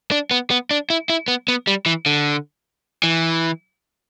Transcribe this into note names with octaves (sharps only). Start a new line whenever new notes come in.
D4
B3
B3
D4
E4
E4
B3
B3
G3
E3
D3
E3